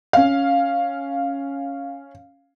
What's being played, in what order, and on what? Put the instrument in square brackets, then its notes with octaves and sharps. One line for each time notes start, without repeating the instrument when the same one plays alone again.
[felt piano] C#4 F5